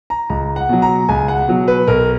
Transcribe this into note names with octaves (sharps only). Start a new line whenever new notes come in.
A#5
C#2 A#5
F#5
B2 F#3
A#5
C#2 G#5
F#5
B2 F#3
B4
B1 A#4